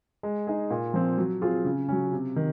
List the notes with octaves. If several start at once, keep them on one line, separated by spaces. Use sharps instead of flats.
G#3
D#4 G#4
A#2
F3 C4
F#3
C4 F4 G#4
C#3
F#3 C#4
C3
D#3